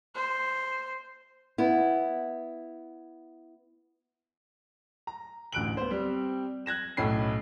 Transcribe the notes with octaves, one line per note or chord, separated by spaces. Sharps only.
C5
B3 E4
A#5
A1 D2 F#6 D7 F#7
B3 C5
G3 C4
F#6 G#6 A#6 E7
B1 A2 A3 C#4 B5 C7